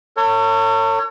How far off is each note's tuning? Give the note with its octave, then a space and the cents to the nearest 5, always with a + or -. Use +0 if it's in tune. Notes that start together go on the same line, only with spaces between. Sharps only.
A4 +45 C#5 +0